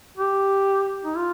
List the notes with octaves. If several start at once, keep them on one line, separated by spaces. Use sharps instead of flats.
G4
D#4
F4